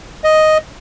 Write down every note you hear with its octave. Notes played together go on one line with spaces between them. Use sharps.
D#5